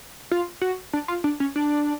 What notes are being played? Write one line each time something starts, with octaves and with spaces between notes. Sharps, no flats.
F4
F#4
D4
F4
D4
C#4
D4